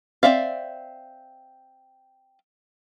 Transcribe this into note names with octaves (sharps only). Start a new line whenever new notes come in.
C4 E4 D5 E5 F5